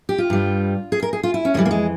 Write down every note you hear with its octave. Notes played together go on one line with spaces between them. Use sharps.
G4
F4
G2 G3
G#4
A#4
G#4
F4
E4
C#4
F2 E3 G3 A#3
A#3
G#3